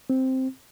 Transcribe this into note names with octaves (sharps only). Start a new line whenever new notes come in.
C4